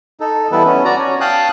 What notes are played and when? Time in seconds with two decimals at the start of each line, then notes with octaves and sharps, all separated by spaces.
0.20 D#4 A4
0.52 E3 G3 B3 E4 A4 B4
0.66 B3 C#4
0.85 F#4 D5 A#5
0.98 C#4 C#5
1.21 F5 G5 A5 D#6 F#6